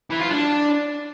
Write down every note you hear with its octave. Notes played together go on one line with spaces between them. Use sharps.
E3
F4
D4